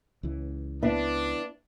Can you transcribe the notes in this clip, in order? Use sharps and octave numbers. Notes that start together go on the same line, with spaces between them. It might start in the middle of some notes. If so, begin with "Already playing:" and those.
C#2 E3
B3 D4 E4 E5